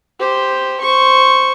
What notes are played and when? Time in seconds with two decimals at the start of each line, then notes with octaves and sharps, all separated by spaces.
0.20 G4 C5
0.81 C5 C#6